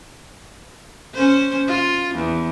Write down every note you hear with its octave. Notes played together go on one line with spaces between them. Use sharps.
C#4 C5
F4
E2